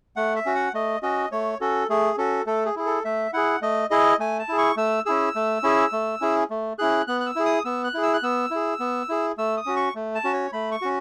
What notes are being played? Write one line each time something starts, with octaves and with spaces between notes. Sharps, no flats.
A3 F#5
E5
C#4 F#4
F#5
A3 D#5
C#4 F#4 D#5
A3 C#5
C#4 F#4 A4
A3 G#4
C#4 F#4 A4
A3 A4
G#4
E4 G#4
A4
A3 E5
E4 G#4 F#5
A3 D#5
E4 G#4 D#5
A3 G#5
A5
E4 G#4
C#6
A3 E6
C#4 E4 G#4 E6
A3
C#4 E4 G#4
A3
C#4 E4 G#4
A3
C#4 E4 G#4 F#6
B3 F#6
F#6
E6
E4 G#4
D#6
B3 E6
F#6
E4 G#4
E6
F#6
B3 E6
E4 G#4
B3
E4 G#4
A3 E6
D#6
C#4 F#4
C#6
A3
A5
C#4 F#4
C#5
A3 B5
C#6
C#4 F#4